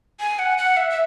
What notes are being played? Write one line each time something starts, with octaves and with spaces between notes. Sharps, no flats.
G#5
F#5
F#5
E5
E5